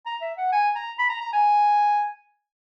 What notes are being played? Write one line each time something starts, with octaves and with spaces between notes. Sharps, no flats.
A#5
E5
F#5
G#5
A#5
B5
A#5
A#5
G#5